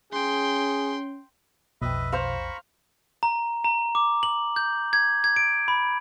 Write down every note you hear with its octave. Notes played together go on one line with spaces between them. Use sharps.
C#4 G#4 G5 C6
B1 F2 B2 B4 D#5 E5 G5
C5 F5 A#5 B5 C#6
A#5
A#5
D6
F#7
G6
G#6
G#6
D7
B5